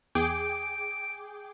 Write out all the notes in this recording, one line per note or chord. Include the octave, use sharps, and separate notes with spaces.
E2 G#4 G5 D6 D7